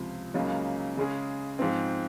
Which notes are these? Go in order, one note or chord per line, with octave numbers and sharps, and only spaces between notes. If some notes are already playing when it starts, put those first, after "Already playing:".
Already playing: C#2 C3 F3
C#2 C#3 F#3 A#3 D#4
C#3 G#3 C#4 G#4
G#2 F3 C4